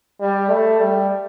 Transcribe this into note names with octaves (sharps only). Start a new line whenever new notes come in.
G3
A3
G3